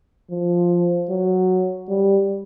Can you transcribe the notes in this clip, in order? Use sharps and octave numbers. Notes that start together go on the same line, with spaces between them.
F3
F#3
G3